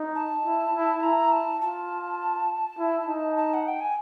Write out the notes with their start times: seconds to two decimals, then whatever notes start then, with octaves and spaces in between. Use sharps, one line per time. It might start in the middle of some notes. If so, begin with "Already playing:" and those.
Already playing: D#4
0.15 A5
0.45 E4
0.74 E4
1.03 E4 A#5
1.32 A5
1.61 F4 A5
2.78 E4
3.08 D#4
3.37 A5
3.54 F#5
3.68 G5
3.81 G#5